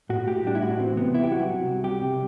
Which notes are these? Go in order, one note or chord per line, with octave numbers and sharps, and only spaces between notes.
A2 F#4
A2 G4
G3 D4
E4
A2 F#4
E3 C4
C3 B3
C2 E4
G4
F#3 F#4
C3
C2
G3 G4
C3